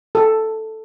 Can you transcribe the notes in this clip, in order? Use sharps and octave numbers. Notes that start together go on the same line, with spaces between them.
A4